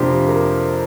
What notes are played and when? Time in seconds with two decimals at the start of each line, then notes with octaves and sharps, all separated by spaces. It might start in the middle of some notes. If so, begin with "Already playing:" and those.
Already playing: F2 C3 A#3 D4 G4 C5
0.28 A#4